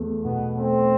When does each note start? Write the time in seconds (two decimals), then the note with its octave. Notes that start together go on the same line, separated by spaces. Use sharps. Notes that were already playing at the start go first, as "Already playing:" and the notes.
Already playing: E2 A3
0.24 B2 B3
0.57 A3 C4